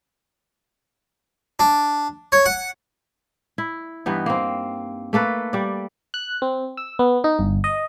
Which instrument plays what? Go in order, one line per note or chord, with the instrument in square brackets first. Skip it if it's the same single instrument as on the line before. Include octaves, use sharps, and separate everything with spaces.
[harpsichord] D4
C#5
F#5
[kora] E4
G2 E3 B3 D#4
A#3 C4
A3 A#3 A4 B4
G3 D5
[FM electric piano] F#6
C4
E6
B3
D#4
G1
D#5